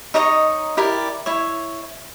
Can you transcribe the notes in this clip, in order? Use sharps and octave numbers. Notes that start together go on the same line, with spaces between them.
D#4 C#5 D#5 A#5
E4 G4 A#4 D5
E4 C#5